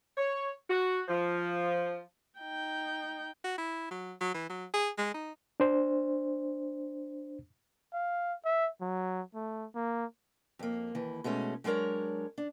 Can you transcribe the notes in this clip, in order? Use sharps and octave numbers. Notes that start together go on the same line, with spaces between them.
C#5
F#4
F3
D#4 G5
F#4
E4
F#3
F#3
E3
F#3
G#4
G#3
D#4
D4 C5
F5
E5
F#3
A3
A#3
F2 A#3
D#2 E3
B2 G#3 A3 C#4
F#3 G#3 D4 A#4 C#5
D4